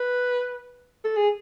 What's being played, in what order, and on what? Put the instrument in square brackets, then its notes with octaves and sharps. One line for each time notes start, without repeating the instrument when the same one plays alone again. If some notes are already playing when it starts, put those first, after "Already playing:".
Already playing: [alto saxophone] B4
A4
G#4